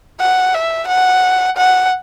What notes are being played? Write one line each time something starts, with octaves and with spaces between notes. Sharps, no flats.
F#5
E5
F#5
F#5